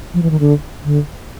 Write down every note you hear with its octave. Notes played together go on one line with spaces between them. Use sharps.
F3
E3
D#3
D3
D3